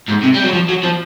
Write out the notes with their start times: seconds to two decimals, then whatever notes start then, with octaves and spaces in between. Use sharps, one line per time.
0.08 G#2
0.23 C3
0.34 G3
0.43 F#3
0.53 F3
0.69 F#3
0.83 F3